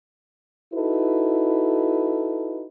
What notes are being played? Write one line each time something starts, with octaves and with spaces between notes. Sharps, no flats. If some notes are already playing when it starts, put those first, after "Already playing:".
D#4 E4 F#4 A4 B4